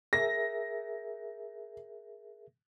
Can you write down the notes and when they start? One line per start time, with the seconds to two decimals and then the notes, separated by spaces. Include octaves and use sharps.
0.13 G#4 A#4 E5 A#6